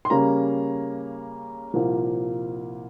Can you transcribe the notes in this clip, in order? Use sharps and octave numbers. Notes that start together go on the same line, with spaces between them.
C6
C#3 G3 A#3 C#4 A#5
C2 A#2 F3 A#3